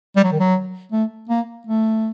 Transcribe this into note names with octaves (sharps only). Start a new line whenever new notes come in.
G3
F#3
D#3
F#3
A3
A#3
A3